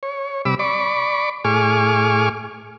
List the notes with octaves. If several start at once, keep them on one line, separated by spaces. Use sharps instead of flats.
C#5
C3 G3 B5 D6 E6
D5 B5 C#6 D6
A2 G#4 G#5 C#6 D6 F6